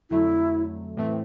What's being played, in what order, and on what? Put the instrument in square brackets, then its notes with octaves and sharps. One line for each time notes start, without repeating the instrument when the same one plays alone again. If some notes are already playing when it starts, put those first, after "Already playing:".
[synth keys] F2 D3 F#3 A3 [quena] E4
[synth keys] A2 E3 A3 C4